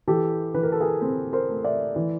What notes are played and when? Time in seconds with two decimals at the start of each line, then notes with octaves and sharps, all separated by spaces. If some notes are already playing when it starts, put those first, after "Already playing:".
0.08 E3 G4 A4
0.54 E3 B4
0.63 A#4
0.72 A4
0.81 G#4 A#4
1.02 C4
1.33 A#4 C5
1.49 A3
1.64 D5 E5
1.96 E3